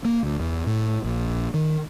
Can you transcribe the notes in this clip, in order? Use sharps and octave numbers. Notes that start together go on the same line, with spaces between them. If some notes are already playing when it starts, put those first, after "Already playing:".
A#3
D2
E2
A2
A#1
D#3